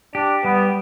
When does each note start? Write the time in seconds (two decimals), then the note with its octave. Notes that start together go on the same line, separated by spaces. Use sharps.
0.15 D4 G4
0.44 G3 B3